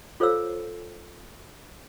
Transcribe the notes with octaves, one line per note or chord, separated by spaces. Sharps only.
F4 A4 C5 C#5 F5 E6